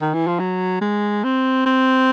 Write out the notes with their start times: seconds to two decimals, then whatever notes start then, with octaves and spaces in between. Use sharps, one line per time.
0.01 D#3
0.14 E3
0.27 F3
0.39 F#3
0.81 G#3
1.24 C4
1.66 C4